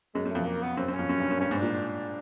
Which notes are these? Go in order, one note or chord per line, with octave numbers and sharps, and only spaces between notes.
F#2 G#3
F#2
A3
F2
A#3
B3
F#2 C4
F#2
C#4
F2
F#2
G2
F#2
G2 C#4
G#2
D4
A#2